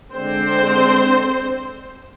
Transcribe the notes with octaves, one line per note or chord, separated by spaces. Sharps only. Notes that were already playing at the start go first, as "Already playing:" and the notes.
D3 G#3 C4 D4 C5